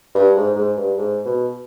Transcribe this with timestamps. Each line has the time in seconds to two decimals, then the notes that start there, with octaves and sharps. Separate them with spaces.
0.15 G2
0.36 G#2
0.56 G#2
0.77 G2
0.97 G#2
1.25 B2